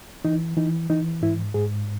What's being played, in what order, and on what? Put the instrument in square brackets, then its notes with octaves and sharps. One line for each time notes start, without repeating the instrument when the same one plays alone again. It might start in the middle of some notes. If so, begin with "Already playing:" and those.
[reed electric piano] E3 D#4
E3 D#4
E3 D#4
G#2 E4
G#2 G#4